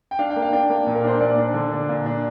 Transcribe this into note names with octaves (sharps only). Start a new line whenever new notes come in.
G5
D4 F5
G5
A#3
F5
D4 G5
A#3
A#2
A#4
D4 C5
A#2 D5
D4
D3
D4
A#2
D4